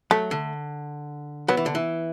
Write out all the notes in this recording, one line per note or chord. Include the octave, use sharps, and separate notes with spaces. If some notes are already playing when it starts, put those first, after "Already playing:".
F#3 A3
D3
F#3 B3
E3
D3
E3